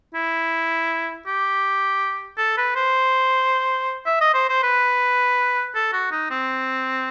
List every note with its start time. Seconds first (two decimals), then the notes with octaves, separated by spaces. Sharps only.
0.15 E4
1.27 G4
2.38 A4
2.57 B4
2.76 C5
4.06 E5
4.21 D#5
4.34 C5
4.49 C5
4.63 B4
5.75 A4
5.93 F#4
6.11 D#4
6.30 C4